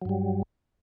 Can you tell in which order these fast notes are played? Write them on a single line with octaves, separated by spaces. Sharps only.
F#3 G2 G3